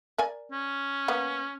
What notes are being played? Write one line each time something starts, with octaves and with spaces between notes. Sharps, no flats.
A#4 D5 G#5
C#4
A#3 B3